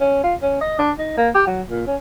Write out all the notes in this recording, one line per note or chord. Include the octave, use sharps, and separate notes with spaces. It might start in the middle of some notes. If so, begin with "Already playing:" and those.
C#4
F4
C#4
D#5
D4
D#4
A#3
G4
F#3
A#2
C#4